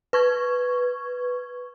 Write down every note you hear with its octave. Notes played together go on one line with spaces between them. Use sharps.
B4 C#6 G#6